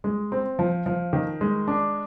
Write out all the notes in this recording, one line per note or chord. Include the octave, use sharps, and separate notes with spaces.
G#3
C4
F3
F3
D#3
G#3
D4